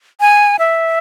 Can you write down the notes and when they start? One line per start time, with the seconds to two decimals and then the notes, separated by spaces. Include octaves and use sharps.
0.20 G#5
0.59 E5